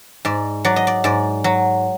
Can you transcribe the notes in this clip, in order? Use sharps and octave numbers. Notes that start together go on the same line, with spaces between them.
G#2 D5
F#3 D5
D#5
D5
G#2 D5
F#3